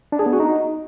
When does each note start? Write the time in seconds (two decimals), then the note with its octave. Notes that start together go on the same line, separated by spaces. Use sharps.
0.12 D4
0.19 G#4
0.26 B3
0.33 F#4
0.40 D#4